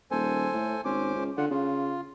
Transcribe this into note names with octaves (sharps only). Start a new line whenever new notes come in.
D#1 A4 C5 G#5
A2
G#1 C#4 C5 D6
C#2
D3 F4 F#5
C#3 F4